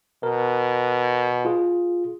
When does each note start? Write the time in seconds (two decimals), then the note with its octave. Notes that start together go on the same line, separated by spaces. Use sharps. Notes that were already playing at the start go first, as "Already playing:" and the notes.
0.23 B2 A#4
1.45 F4 G#4